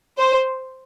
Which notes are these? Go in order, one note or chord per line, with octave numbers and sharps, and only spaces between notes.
C5